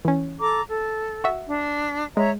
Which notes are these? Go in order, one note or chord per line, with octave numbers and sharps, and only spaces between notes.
E3 C#4
A4 A#5 D6
A4
F#4 E5
D4
G#3 C#5 E5 A#5